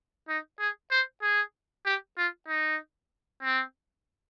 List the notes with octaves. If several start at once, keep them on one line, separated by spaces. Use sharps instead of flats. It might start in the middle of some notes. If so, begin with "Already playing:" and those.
D#4
G#4
C5
G#4
G4
F4
D#4
C4